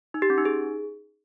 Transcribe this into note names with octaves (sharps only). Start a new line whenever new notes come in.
D#4
G4
C#4
D#4
G#4